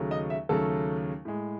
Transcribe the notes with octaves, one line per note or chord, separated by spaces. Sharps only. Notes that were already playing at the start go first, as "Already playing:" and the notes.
Already playing: D#2 C#3 F#3 A3
D#5
E5
D#2 C#3 F#3 A3 A4
A2 G#3